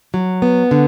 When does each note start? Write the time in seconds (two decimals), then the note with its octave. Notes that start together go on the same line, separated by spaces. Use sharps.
0.14 F#3
0.42 B3
0.71 D3